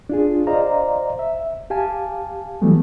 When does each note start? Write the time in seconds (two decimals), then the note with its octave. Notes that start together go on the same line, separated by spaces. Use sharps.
0.09 D4 F4 G#4
0.47 C5 D5 D#5 F5 A#5
1.19 E5
1.70 G4 F5 G#5 A5
2.62 E3 F#3 G3 A3 B3